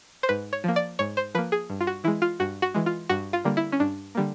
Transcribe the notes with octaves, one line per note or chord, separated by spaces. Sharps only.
C5
G#2 B4
C#5
F3 A#3
D5
G#2 C#5
C5
F3 A#3 B4
G#4
G2
F4
F#4
E3 G#3 E4
F4
G2 F#4
F#4
E3 G#3
F4
G2 F#4
F4
D3 G3 A#3
E4
C#4
G2 D4
D3 G3 A#3